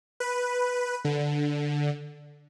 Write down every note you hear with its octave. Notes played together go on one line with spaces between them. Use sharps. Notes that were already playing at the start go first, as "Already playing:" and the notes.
B4
D3